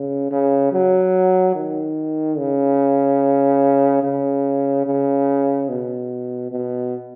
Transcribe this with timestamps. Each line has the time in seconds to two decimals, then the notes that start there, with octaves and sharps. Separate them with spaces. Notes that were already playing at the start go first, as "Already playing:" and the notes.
Already playing: C#3
0.31 C#3
0.72 F#3
1.55 D#3
2.38 C#3
4.03 C#3
4.86 C#3
5.69 B2
6.51 B2